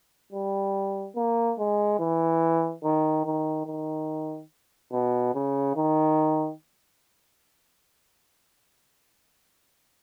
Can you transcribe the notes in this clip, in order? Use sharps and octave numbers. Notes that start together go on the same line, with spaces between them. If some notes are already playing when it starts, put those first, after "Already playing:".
G3
A#3
G#3
E3
D#3
D#3
D#3
B2
C#3
D#3